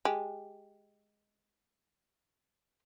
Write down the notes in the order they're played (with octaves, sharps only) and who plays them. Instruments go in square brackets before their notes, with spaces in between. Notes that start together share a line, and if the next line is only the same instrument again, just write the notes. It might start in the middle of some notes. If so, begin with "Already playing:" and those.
[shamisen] G#3 G4